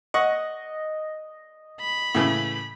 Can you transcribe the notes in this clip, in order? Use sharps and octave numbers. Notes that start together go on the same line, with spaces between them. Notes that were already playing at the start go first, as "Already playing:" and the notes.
D#5 F#5 C#6
B5
A2 C#3 E3